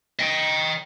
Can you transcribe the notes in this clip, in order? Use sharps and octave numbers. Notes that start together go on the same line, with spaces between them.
D#5 G5